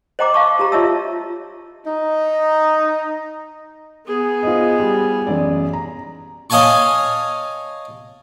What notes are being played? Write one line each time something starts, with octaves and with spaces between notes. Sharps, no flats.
C5 D#5 G5 A#5 D6
F5 A5 C#6
F#4 G4 A#5
F4 C#5 D#5 E5 A5 E6
D#4
B3 G#4
F4 C5 D#5
G3
A1 F#2 D5
A#5
C#5 D#5 F5 G#5 A5 C#6